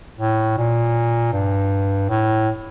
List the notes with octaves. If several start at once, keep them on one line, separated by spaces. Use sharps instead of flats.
A2
A#2
G2
A2